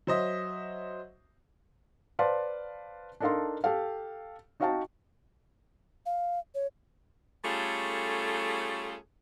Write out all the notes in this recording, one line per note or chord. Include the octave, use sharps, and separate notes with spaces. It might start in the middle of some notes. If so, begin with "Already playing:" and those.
F#3 C5 D#5 E5
B4 C5 D5 F5 A5 C6
D4 D#4 A4 A#4 F5 C6
G4 A4 F5
D#4 F#4 D#5 F5 G5 A5
F5
C#5
G3 A3 C#4 F4 G#4 A4